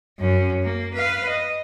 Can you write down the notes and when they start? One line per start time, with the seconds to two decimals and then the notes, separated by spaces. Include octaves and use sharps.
0.19 F#2 C#4
0.63 A#3
0.94 B4 F5
1.29 D#5